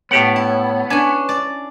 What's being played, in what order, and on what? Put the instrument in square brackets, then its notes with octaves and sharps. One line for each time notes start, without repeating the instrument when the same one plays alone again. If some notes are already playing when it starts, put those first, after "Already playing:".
[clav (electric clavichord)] A2 G4 F#5 [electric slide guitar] B3 [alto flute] C#5
[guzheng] E4
[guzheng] C#4 D4 [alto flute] B4 [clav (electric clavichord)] G#5
[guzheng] D5